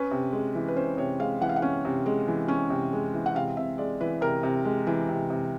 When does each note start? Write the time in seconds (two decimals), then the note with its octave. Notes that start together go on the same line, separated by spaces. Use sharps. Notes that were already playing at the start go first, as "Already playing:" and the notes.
Already playing: C#4 B4
0.11 C3
0.32 G#3
0.55 E3
0.68 B4
0.76 C#4 C5
0.97 C3 C#5
1.19 G#3 F5
1.41 E3 F#5
1.49 F5
1.56 F#5
1.62 C#4
1.85 C3
2.06 G#3
2.28 E3
2.48 C#4
2.70 C3
2.93 G#3
3.14 E3
3.26 F#5
3.35 C3 F5
3.57 C3 E5
3.78 G#3 D5
4.01 E3 B4
4.21 C3 A#4
4.43 C3
4.65 G#3
4.87 E3
5.09 C3
5.30 C3